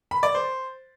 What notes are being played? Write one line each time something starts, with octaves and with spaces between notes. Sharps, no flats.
B5
D5
C5